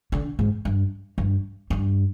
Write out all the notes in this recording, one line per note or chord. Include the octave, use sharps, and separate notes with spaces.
D3
G#2
G2
G2
G2